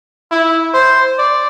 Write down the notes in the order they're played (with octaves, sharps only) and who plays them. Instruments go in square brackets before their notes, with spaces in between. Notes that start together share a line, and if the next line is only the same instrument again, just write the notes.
[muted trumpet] E4
C5
D5